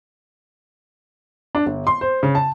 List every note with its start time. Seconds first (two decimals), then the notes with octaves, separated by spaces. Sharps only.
1.55 D4
1.66 G1
1.87 C6
2.01 C5
2.23 C#3
2.35 A5